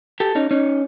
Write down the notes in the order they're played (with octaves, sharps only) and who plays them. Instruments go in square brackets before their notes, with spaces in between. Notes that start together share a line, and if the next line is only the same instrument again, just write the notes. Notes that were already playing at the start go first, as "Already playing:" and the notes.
[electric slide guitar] G4 A4
C#4 D#4
C#4 D#4